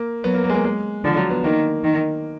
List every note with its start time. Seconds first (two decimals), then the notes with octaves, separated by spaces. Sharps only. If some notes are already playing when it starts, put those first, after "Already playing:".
Already playing: A#3
0.24 F#3 B3
0.34 A#3
0.44 A#3
0.50 G#3
0.54 A#3
0.64 G#3
1.04 D3 F3
1.17 F#3
1.30 B3
1.44 D#3 A#3
1.84 D#3